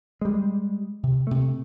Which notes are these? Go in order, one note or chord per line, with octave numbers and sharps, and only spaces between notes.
G3 G#3
C3
C3 A3